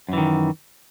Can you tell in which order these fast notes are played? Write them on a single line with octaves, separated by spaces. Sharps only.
F#2 E3 D#3